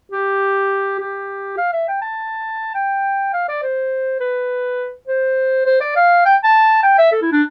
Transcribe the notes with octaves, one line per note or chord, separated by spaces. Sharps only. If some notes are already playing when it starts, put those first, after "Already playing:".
G4
G4
F5
E5
G5
A5
G5
F5
D5
C5
B4
C5
C5
D5
F5
G5
A5
G5
E5
A4
E4
D4